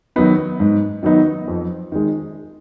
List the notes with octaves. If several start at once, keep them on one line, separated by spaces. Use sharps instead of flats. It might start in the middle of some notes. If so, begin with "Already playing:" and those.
D#3 F#3 B3 D#4
G#2
D#3 F#3 B3 D#4
F2
D#3 G#3